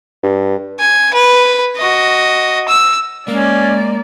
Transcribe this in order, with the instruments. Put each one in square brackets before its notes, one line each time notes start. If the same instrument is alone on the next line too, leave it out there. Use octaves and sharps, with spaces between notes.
[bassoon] G2
[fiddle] G#5
B4
F#4 D#5
E6
[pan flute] G#3 [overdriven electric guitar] A#3 [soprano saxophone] C#4 [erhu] D5